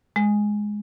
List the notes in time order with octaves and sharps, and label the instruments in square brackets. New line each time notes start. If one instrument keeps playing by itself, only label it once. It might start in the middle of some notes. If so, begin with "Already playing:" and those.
[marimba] G#3